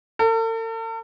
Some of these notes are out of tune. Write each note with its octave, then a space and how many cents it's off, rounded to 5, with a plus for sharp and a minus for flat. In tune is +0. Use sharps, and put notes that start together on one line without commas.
A4 +45